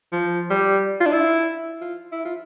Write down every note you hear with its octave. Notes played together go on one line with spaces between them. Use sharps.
F3
G3
F4
D4
E4
F4
E4
F4